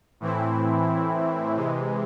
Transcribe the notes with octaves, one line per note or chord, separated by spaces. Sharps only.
A2 E3 C4 E4
C3 E3 G#3